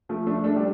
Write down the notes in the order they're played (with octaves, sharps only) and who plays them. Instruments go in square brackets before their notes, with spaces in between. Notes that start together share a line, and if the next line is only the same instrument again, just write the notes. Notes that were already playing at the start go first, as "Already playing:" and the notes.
[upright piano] F3 A3
A3 D4
A3 D4
G3